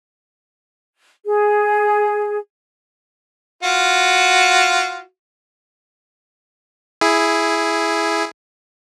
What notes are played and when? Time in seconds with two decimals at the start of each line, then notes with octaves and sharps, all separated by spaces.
1.25 G#4
3.63 F4 F#4
7.01 E4 G#4